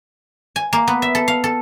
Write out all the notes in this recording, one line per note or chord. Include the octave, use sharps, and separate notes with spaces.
G#5
A#3
B3
E5
A4
F5
A4